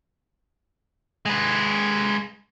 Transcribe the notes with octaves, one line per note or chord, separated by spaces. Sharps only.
G#3 B4